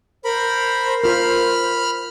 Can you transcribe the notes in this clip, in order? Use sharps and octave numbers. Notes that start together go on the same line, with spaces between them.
A#4 C5 B5
F4 A#4 B5 F6